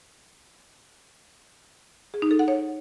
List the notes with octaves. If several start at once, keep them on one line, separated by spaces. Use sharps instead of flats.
G#4
D#4
A4
F#5
C#5